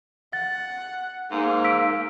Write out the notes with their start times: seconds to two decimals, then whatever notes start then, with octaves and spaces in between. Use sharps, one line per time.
0.33 F#5 A6
1.31 G#2 A#3
1.64 E6 B6 D7